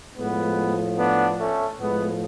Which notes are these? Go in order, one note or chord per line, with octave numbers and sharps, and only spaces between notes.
A2 F3 G#3 B3
B3 D4
A3 C#4
A2 F3 G#3 B3